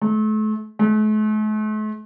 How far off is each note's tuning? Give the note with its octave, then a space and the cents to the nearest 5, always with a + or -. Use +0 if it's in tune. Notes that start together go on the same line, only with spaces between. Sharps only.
A3 -35
A3 -45